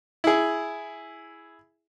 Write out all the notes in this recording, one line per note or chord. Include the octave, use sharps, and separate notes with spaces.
E4 G#4